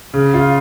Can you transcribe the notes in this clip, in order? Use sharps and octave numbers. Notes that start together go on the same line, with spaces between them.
C#3
C#3 F4